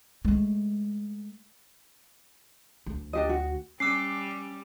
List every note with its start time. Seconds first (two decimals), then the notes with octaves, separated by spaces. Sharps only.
0.25 G#3 A3
2.86 D2
3.13 D4 G4 D#5
3.29 F#4
3.80 G3 C#4 D6 E6 C7